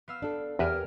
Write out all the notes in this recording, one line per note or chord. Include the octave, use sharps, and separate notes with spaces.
B3 F5 E6
D4 A4
E2 G4 A#4 B4 E5 G#5 F6